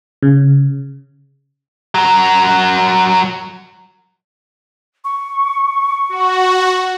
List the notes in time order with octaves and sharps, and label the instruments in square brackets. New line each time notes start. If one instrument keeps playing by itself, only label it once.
[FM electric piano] C#3
[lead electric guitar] F#3 A#4
[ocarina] C#6
[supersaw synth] F#4